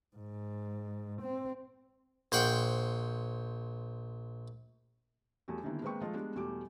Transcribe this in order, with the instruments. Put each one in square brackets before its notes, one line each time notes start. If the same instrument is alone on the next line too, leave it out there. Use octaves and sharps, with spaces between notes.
[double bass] G#2
C4
[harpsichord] A#1 C5 F#5 G5
[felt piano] E2 F#3 G3 A3
D3 D#3 G3 A#3 B3 E4
G#3 A#3 C4 B4 G5 C#6
F3 G#3 A3 F4 A4 D#5
G3 G#3 B3 D4
E2 B2 G3 A3 D6